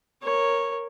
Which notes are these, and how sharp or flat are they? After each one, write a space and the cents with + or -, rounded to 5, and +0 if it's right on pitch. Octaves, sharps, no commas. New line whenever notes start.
A#4 +0 C#5 -10